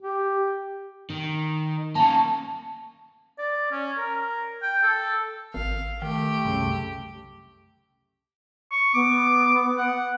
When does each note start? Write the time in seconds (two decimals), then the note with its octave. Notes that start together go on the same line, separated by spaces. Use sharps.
0.02 G4
1.10 D#3
1.95 A#3 C#4 A5
3.38 D5
3.72 C#4
3.98 A#4
4.63 G5
4.83 A4
5.54 G#1 F5
6.02 D#3 A3 G4
6.45 C2 F#2 C#3
8.72 C#6
8.94 B3 D6
9.78 F#5